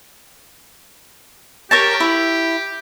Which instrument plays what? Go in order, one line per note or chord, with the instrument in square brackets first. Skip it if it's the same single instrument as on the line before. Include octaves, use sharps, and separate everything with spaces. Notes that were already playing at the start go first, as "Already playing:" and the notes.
[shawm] G4 [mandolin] A#4 C#5 A5
[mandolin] E4